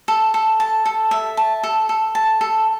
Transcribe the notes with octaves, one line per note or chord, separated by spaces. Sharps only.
A4
A4
A5
A4
E5
A5
A4
A4
A5
A4